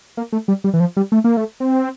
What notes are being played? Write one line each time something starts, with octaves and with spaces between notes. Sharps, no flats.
A#3
A3
G3
G3
E3
F3
G3
A3
A#3
A3
C4